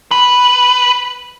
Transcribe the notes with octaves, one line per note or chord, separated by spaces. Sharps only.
B4